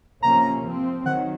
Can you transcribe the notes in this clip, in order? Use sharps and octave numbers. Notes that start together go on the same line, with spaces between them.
C3 F3 A#3 C#4 A#5
F3 C4
D#3 F#3 F#5